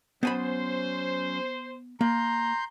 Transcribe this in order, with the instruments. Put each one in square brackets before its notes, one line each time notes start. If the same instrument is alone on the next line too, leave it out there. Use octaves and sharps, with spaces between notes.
[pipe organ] F#3 C#4 [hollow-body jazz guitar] B3 G#5 B5 [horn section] C5
[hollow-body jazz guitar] A#3 [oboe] A#5 [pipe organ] C6 G6